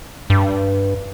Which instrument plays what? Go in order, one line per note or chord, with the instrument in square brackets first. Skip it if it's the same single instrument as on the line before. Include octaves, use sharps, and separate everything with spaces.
[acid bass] G2